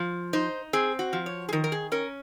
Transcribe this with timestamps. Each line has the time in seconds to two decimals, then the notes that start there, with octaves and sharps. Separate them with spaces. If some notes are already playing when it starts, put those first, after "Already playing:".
Already playing: F3
0.33 D#4 C5
0.73 C4 G#4
0.99 F#4
1.13 F3
1.26 C#5
1.49 G#4
1.53 D#3 A#4
1.64 A#4
1.72 G#4
1.92 C#4 A#4